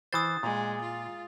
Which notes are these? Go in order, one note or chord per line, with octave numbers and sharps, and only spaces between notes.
E3 C5 D#6 A6
A#2 G#3
F4